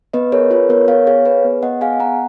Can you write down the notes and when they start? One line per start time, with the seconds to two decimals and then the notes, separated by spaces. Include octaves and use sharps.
0.13 B3 B4 D#5
0.32 G#4 A#4 C#5
0.51 F4 B4
0.69 B3 A#4 C#5
0.88 B3 C#5 F5
1.07 G#4 C#5 F5
1.26 G#4 B4
1.44 B3
1.63 B3 D#5 F#5
1.81 G#4 F5 G#5
2.00 B3 F#5 A#5